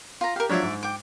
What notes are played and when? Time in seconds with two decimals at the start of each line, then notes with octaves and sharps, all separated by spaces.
0.21 F4 A#5
0.36 G4 A#4 F5
0.49 F3 F#3 D4 C#5 D5 E5
0.62 G#2
0.83 G5 D6